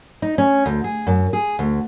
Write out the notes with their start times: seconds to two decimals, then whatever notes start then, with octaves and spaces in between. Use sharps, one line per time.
0.22 D#4
0.38 C#4
0.66 D2
0.84 G#4
1.07 F#2
1.33 G#4
1.59 D2